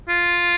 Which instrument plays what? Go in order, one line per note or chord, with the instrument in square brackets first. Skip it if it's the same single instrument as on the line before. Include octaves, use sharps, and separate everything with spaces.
[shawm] F4